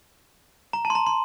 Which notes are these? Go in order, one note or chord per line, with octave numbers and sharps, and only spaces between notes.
A#5
A5
C6
A#5
C6